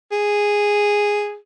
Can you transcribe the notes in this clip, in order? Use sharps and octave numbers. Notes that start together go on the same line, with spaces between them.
G#4